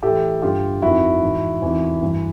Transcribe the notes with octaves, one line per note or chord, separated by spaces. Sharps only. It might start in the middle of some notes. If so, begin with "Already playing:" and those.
A2 E3 G4 A4
G2 D3 F4 G4
F2 C3 D#3 E4 F#4
G#2 E3
E2 C3 D#3
G2 E3